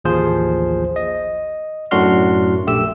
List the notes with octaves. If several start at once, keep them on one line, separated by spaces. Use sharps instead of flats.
A1 D#2 F3 G#4 C5
D#5
F#2 A2 D4 F#4 C6 F6
A#1 A3 G4 E6